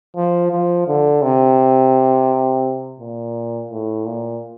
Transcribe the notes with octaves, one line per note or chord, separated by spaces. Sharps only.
F3
F3
D3
C3
A#2
A2
A#2